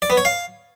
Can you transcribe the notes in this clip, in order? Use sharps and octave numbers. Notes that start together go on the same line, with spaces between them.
D5
B3
C#5
F5